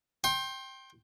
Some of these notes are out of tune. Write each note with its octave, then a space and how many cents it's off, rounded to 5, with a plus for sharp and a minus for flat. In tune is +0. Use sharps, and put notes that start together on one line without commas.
G5 +0 C6 +30